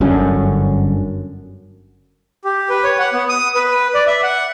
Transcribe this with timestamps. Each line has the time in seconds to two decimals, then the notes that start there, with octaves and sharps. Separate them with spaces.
0.01 G1 F#2 D3 C#4
2.44 G4
2.70 B4
2.84 C#5
2.99 F#5
3.13 B3
3.29 D#6
3.55 B4
3.94 D5
4.07 E5
4.23 F#5